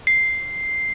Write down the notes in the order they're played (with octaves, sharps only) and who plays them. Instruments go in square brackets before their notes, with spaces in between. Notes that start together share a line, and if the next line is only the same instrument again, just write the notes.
[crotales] C7